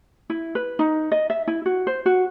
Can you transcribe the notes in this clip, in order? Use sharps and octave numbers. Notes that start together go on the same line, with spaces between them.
E4
B4
D#4
D#5
E5
E4
F#4
C5
F#4